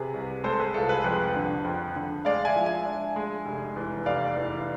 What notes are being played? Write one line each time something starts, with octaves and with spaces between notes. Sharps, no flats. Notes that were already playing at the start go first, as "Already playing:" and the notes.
Already playing: C3 G#4 B4
C2
G#3 A4 C5
G#4 B4
C2 F4 A4
G#4 B4
F2 G#4 B4
D3
F2
D3
G#3 D5 F5
E5 G#5
F3
E5 G#5
D4
G#3
F1
E2
F1 D5 F5
E2